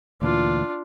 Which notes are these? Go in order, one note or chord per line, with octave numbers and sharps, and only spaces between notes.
D2 A#2 E3 D4 F4